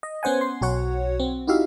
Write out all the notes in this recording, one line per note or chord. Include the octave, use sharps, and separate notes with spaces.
D#5
B3 C#4 C5 F#5 G#5
C6
B1 F#4 C#5 F#5
C4
D#4 E4 F#4 G4 E5 F5